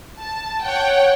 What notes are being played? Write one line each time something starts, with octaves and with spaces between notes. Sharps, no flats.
A5
C#5 F#5 G5